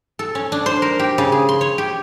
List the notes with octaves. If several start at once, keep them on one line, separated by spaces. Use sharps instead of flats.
A4
C#4
D4
C5
A#4
G4
C#3
G#4
C6
C#5
G4